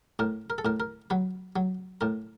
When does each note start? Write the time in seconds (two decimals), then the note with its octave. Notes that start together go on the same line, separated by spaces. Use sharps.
0.19 A2 A#4
0.50 A#4
0.58 A4
0.65 A2 A#4
0.80 A#4
1.10 F#3 B4
1.56 F#3
2.01 A2 A#4